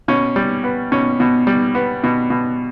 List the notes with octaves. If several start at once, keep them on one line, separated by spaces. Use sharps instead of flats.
B2 C#4
G3
B3
B2 C#4
B2
G3
B3
B2
B2